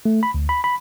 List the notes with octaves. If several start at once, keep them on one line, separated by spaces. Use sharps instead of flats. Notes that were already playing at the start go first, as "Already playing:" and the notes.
A3
B5
D2
B5
B5